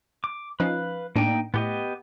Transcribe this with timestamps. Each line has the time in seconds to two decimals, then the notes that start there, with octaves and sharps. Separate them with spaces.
0.24 D6
0.60 F3 C#4 D#4 B4 F5
1.16 A2 A#3 D4 D#4 G5
1.54 A2 B3 G4 D#5